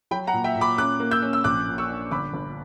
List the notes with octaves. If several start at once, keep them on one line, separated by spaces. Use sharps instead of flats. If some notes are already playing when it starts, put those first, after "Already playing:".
F#3 G5 B5
F#5 A#5
A#2
E5 G5
A#2
B5 D6
C#4 D6 F#6
A#3
E6 G6
C#4
E6
A#1 D6 F#6
A#2
C#6 E6
D4
G1 B5 D6
G1